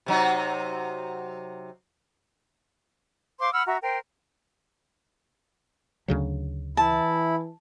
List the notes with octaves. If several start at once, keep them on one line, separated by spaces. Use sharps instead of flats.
C3 F#3 D#4
C5 F5 C6 D6
F#5 B5 E6 F6
F#4 E5 A#5
A#4 C5 G5
D2 C#3 F#3
E3 E4 A5